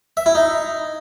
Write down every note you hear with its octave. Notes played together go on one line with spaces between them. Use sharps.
E5
E4
D#4